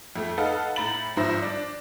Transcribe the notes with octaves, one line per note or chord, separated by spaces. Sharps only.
F2 A3
D#4 A4 B4 F5 F#5
A2 A#5 B5 A6 F#7
G#1 G2 F3 C5 E5 A#6
D4